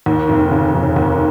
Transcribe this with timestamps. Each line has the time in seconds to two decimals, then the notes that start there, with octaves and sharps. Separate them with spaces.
0.06 D#2
0.29 F1
0.51 C#3
0.74 F1
0.96 D#2